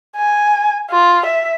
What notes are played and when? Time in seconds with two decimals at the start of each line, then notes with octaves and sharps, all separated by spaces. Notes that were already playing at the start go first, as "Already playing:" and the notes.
0.16 G#5
0.91 F4
1.25 E5